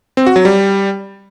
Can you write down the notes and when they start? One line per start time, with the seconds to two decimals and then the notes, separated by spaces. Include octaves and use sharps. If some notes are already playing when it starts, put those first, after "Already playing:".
0.17 C4
0.26 F#4
0.36 F#3
0.45 G3